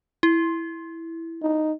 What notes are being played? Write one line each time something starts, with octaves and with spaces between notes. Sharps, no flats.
E4
D#4